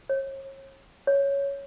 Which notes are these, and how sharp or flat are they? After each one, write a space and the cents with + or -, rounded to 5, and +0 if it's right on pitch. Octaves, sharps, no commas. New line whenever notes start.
C#5 -40
C#5 +5